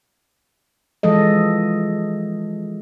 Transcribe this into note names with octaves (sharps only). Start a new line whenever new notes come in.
E3 F3 G#3 A4 D#5